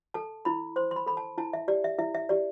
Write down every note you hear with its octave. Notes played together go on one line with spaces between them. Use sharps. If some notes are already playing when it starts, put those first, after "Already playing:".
A4 A5
E4 B5
C5 C6
C6
B5
A4 B5
A5
E4 A5
E5
G4 D5
E5
E4 E5
E5
G4 D5